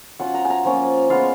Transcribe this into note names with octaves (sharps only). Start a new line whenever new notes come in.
F#3 C#4 F4 F#5
A#5
G#5
A#5
F3 A#3 C#4
G#3 B3 F4 F5